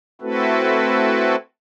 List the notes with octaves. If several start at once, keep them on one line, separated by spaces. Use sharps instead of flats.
A3 C4 E4 F#4 A4 B4